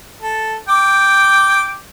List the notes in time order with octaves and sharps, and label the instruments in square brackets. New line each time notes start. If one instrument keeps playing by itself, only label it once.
[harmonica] A4
G5 D6